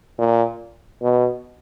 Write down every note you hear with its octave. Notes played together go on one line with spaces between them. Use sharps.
A#2
B2